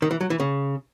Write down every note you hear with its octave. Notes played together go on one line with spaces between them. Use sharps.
D#3
E3
F#3
E3
C#3